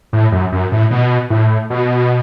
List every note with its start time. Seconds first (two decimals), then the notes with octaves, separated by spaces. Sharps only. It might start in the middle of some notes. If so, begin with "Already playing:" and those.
0.13 A2
0.32 F#2
0.52 F#2
0.72 A2
0.91 B2
1.30 A2
1.70 B2